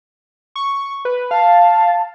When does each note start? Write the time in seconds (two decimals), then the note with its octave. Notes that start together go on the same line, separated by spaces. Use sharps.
0.56 C#6
1.05 B4
1.31 F5 A5